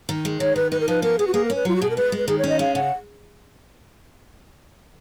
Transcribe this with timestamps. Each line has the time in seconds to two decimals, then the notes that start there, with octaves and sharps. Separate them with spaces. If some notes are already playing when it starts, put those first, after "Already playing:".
0.09 D#3
0.25 G#3
0.40 D#3 C#5
0.56 D#3 B4
0.72 D#4 B4
0.80 A#4
0.88 F3 B4
1.02 B3 A#4
1.19 B3 G#4
1.27 F#4
1.34 A#3 G#4
1.45 C#4 A#4
1.55 B4
1.65 F#3 F4
1.76 F#4
1.82 B2 G#4
1.90 A#4
1.97 G#3 B4
2.12 G#3
2.18 B4
2.28 D#3 G#4
2.38 C#5
2.44 C#4
2.49 D#5
2.59 G#3 F5
2.75 C#3 F#5